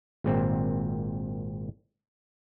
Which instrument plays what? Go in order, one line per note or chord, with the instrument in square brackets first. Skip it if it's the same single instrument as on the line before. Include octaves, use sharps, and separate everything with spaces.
[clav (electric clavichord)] G#1 A#2 C4